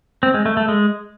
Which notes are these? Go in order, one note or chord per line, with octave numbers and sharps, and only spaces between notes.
C4
G#3
A3
A3
G#3